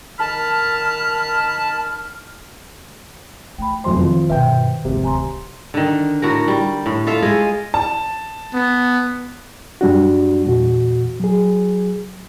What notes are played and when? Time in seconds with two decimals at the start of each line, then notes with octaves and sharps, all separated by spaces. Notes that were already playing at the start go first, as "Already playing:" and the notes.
0.20 D#3 A5 B5 F6
3.58 A3 G5 B5
3.84 F1 F#2 C5 C6
3.99 D#3 F3
4.29 G2 B2 B4 C5 E5 G5
4.85 G#1 F2 C3
5.04 D1 G#5 A#5 C6
5.74 D3 D#3
6.22 A2 F#4 A#4
6.48 G3
6.86 A2
7.07 F4 A4 E5 F5
7.22 G#3 G#4 D#5
7.74 A5
8.54 B3
9.81 F#2 G3 D4 F#4
10.47 E2 A#2 F#4
11.20 F#3 G#4